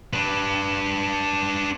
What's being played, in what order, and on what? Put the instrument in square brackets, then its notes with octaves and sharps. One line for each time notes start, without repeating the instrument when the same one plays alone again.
[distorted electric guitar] D4 B4